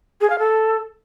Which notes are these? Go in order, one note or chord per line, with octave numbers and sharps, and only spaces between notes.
G#4
F5
A4